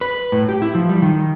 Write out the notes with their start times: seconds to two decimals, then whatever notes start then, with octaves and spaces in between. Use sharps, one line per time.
0.01 B4
0.32 A2
0.49 G4
0.62 E4
0.75 F3
0.89 G3
1.02 D#3